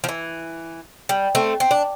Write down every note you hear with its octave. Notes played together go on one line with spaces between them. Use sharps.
F3
E3
G3
A3 C4
C4
D4